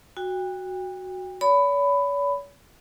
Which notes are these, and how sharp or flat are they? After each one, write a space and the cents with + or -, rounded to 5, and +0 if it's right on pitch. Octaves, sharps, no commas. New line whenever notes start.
F#4 +0 G5 +35
C#5 +45 B5 +15